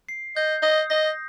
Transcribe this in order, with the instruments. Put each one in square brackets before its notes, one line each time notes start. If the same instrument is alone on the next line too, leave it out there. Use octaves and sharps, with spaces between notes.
[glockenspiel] C7
[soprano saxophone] D#5 [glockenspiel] G6
[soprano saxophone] D#5 [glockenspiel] D#6
[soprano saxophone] D#5 [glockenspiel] A#6